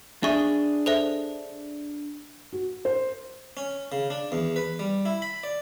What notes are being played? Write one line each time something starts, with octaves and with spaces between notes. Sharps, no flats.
D4 G#4 E5 C#6
A4 C5 E5
F#4
C5
C#4
C#3
D4
E2
B4
G3
E4
B5
D5